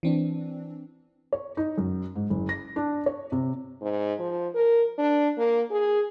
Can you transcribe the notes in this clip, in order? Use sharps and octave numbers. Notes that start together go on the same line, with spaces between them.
E3 C4 D4
C#5
D#4
F#2
G#2
F#1
A#6
D4
C#5
C3
G#2
F3
A#4
D4
A#3
G#4